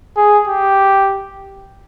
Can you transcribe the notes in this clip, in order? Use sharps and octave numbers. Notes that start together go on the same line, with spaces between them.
G#4
G4